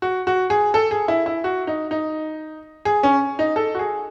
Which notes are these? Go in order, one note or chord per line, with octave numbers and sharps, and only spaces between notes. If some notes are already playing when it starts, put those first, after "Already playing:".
F#4
F#4
G#4
A4
G#4
E4
E4
F#4
D#4
D#4
G#4
C#4
D#4
A4
F#4
G#4